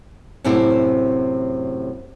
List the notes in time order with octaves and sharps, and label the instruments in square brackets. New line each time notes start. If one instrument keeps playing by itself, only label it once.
[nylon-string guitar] F#2 A2 C3 A3 C4 E4